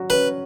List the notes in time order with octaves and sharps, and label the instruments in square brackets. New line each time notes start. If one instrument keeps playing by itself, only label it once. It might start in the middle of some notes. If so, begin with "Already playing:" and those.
Already playing: [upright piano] F#3 F#4
[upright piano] C#4 [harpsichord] B4